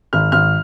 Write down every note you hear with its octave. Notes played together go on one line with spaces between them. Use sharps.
G#1 F6
G#1 F6